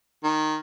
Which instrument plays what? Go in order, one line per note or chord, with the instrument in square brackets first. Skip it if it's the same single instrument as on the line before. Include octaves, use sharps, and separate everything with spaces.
[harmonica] D#3